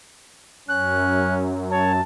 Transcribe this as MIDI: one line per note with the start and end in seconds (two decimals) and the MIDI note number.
0.69 2.01 42
0.69 1.56 61
0.69 1.34 90
1.71 1.92 73
1.71 2.02 81